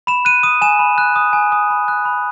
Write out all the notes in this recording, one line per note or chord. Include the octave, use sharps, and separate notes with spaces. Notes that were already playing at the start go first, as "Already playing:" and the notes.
B5 E7
F#6 D#7
D#6 D#7
G#5 E7
B5
F#6
D#6
G#5
D#6
B5
F#6
B5